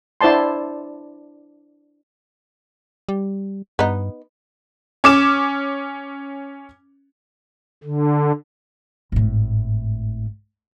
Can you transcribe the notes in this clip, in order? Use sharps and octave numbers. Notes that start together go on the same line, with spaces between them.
D4 E4 C5 D5 A5 C6
G3
G2 B3 D#4
C#4 D6 E7
D3
G#1 A2